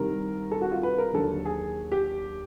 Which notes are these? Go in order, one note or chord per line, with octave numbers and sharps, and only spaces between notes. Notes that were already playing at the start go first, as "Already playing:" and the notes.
Already playing: C2 C3 D#3 G3 A#4
A4
F#4
F4
B4
A#4
D#2 D3 F#3 A4
G#4
G4